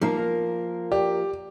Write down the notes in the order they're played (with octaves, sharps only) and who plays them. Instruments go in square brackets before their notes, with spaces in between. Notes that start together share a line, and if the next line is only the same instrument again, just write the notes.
[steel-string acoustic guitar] F3 A#3 [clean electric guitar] G3 D#4 F5
[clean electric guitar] A#4
[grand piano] G4 [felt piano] D5